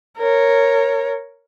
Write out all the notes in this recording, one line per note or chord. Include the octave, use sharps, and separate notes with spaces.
A#4 C#5